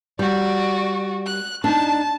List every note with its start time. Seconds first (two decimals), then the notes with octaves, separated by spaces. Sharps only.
0.19 G3 F#4 D5
1.26 F#6
1.64 D4 D#4 A5